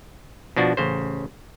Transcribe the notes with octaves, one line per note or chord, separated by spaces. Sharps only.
B2 F3 D4 F#4
A1 C#3 C5